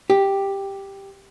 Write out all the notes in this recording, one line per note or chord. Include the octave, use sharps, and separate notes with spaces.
G4